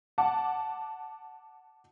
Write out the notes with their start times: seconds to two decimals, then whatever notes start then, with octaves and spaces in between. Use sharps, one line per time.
0.18 F#5 A5 D6